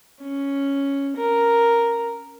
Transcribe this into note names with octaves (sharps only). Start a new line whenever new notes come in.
C#4
A#4